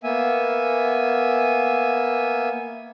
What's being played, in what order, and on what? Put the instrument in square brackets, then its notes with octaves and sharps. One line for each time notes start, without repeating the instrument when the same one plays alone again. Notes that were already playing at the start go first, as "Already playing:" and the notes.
[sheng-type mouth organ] A#3 B3 E5 G#5